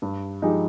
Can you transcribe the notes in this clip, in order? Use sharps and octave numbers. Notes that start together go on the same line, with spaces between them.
G2
F3 G#3 D#4 G4